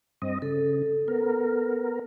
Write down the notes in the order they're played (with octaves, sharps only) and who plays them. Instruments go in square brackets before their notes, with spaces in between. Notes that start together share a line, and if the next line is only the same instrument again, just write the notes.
[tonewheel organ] G2 C4 D#5
[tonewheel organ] C#3 [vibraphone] A4
[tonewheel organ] B3 A#4